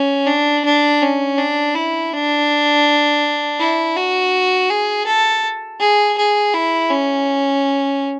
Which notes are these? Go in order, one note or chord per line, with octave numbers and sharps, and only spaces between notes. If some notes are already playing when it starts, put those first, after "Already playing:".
Already playing: C#4
D4
D4
C#4
D4
E4
D4
E4
F#4
G#4
A4
G#4
G#4
E4
C#4